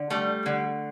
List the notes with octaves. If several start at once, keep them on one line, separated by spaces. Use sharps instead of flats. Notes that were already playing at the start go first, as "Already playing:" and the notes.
Already playing: D3
G3 A3
D3